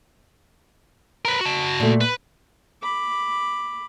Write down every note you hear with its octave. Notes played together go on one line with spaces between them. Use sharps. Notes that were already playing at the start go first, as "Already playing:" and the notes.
A#4 B4
F#4 A5
A#2 A3
B4
B5 D6